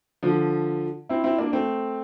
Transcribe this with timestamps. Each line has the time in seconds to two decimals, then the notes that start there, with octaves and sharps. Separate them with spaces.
0.23 D3 F3
1.09 C4 E4
1.24 C4 E4
1.39 A#3 D4
1.53 A3 C4